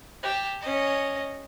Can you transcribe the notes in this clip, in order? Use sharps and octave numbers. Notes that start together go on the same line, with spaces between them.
G4 A5
C#4 D#5